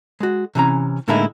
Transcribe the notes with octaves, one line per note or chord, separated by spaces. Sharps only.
G#3 F#4
C3 E3 C#4 A#5
A2 D3 G#3 A#3 D#4 E4